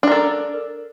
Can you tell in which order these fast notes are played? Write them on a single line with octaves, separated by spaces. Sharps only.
D4 A#4 A4